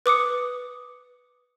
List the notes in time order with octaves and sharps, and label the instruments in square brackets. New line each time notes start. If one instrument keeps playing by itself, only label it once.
[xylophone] B4 D6 D#6 C#7